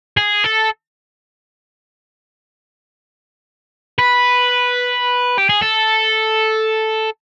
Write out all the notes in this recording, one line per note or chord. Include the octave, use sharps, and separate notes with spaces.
G#4
A4
B4
G4
G#4
A4